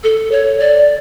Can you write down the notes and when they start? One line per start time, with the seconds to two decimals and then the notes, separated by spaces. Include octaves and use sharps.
0.03 A4
0.31 C#5
0.59 D5